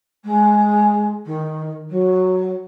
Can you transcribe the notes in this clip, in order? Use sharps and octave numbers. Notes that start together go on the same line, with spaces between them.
G#3
D#3
F#3